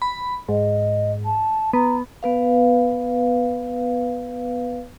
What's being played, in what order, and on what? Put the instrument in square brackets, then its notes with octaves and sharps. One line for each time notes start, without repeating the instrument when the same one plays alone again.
[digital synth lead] B5
[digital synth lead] G#2 [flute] D#5
[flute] A5
[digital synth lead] B3 [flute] A#5
[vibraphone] B3 B4 F5